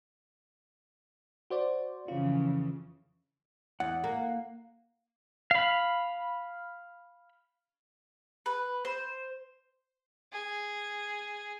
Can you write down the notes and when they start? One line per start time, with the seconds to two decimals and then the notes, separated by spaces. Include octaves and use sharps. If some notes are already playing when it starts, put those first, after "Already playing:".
1.50 F#4 C5 D5
2.08 F2 C#3 E3 F4
3.80 E2 F#5
4.04 A#3
5.51 F5 B5
8.46 B4
8.85 C5
10.33 G#4